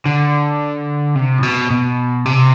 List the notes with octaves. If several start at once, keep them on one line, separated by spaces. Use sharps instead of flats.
D3
C3
A2
B2
B2
C3